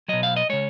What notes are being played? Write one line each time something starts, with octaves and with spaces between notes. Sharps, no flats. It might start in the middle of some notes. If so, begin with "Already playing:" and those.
B2 F#3 D#5
F5
D#5
C#3 G#3 C#5